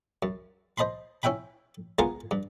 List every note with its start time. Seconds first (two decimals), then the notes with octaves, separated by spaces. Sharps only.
0.23 F#2
0.78 C5 D#5 A5 B5 C6
1.23 C#4 E4 E5 G5 B5
1.99 C#2 B3 F4 A#4 F5 G#5
2.31 G2